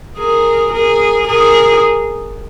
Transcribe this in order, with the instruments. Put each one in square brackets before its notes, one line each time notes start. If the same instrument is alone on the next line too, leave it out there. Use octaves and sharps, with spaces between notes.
[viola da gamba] G#4 A#4
G#4 A#4
G#4 A#4